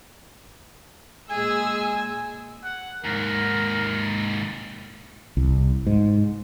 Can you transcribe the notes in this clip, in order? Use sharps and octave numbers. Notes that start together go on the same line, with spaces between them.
A#2 G#3 G#4 G#5 E6
F#5
D#2 G#2 A#4
C2
G#2